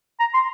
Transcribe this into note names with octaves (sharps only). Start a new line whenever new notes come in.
A#5
C6